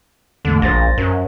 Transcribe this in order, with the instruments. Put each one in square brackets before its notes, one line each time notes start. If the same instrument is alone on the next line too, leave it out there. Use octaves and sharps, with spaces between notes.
[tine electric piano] E2 G#2 A3 [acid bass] D3
[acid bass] A#1 [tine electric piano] C5 A6 A#6
[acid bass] F#2 [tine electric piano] A#4